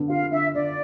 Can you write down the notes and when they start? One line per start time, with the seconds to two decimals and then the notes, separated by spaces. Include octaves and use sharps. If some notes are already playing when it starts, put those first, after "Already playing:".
Already playing: D3 B3
0.10 F4 F5
0.32 D3 E5
0.55 D3 D5